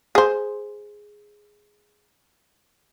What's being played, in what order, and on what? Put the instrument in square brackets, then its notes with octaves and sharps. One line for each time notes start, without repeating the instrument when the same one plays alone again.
[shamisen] G#4 C5